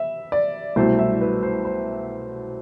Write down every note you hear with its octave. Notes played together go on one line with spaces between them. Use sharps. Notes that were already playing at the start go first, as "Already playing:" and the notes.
Already playing: E5
D5
C2 B2 F#3 A3 E4 C5
E5
B4
C5
C5